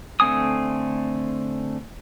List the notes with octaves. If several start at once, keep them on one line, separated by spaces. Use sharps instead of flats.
D3 A3 C4 G#5 D#6